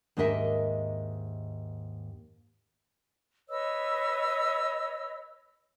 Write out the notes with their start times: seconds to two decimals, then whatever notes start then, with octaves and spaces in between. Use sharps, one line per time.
0.17 D#2 G#2 D4 A#4 D#5 E5
3.49 B4 C#5 D#5 E6